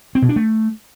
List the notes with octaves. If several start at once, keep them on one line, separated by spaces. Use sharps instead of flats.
C4
B2
D4
A3